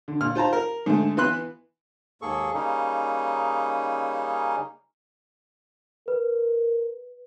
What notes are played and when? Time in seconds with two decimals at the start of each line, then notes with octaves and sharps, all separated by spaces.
0.08 D3
0.21 A#2 F6
0.35 F4 C5 A5 A#5
0.53 A#4
0.86 G#2 D3 A3
1.17 E3 B3 B4 C6 F#6
2.22 D#2 G#2 A#3 G#4 A4 C#6
2.54 C#3 G3 A#3 C#4 D#4
6.08 A#4 B4